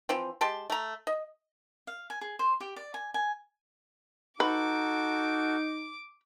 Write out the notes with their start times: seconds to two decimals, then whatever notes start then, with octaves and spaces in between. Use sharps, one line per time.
0.09 E3 F3 C4
0.41 G#3 G4 A5 C6
0.70 A3 A#5
1.07 D#5
1.87 F5
2.10 G#5
2.21 G#4
2.39 C5
2.60 G4
2.76 D5
2.94 G#5
3.14 G#5
4.40 D#4 F#4 A4 B4 D6